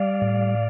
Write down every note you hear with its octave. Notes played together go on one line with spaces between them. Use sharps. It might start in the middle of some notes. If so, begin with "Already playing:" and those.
Already playing: G3 D5 F5
A2